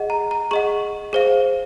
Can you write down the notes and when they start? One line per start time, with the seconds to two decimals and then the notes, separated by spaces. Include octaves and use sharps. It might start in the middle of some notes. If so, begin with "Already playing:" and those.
Already playing: G#4 D#5 F#5
0.10 A#5
0.31 A#5
0.51 G#4 D#5 F#5 C#6
1.13 G#4 C5 F5